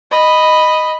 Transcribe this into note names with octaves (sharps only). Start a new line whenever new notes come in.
D#5 B5